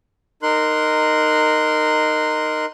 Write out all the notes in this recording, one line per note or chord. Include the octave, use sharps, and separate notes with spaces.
D#4 A#4 C6 F#6